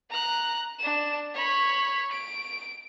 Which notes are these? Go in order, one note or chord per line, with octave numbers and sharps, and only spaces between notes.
A#5 F#6
D4 E7
C#5 B5
D7